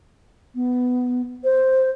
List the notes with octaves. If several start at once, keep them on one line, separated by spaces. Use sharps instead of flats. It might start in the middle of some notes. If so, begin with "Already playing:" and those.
B3
C5